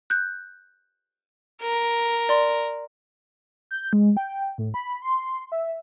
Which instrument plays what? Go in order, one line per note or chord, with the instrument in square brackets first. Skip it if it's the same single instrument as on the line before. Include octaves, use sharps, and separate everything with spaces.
[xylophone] F#6 G6
[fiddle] A#4
[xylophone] D5 C6
[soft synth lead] G6
G#3
G5
A2
B5
C6
E5